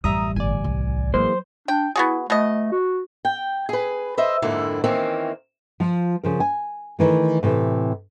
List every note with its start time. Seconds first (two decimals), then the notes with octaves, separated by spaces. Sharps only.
0.04 A1 F#2 G3 E5 A#5 D#6
0.36 G1 D5 G#5
0.64 C2
1.14 E3 F#3 G#3 A#3 C5
1.68 D4 G5
1.96 B3 E4 F#4 G#4
2.30 B2 A3 D#5
2.72 F#4
3.25 G5
3.69 G#4 B4
4.17 B4 C5 D#5 E5
4.42 F2 G#2 D3 A#3 E4
4.84 D#3 E3 A#3 C4 C#4
5.80 F3 F4
6.23 C#3 F3 A#4
6.40 G#5
6.99 D#3 E3 A3
7.43 A2 C3 E3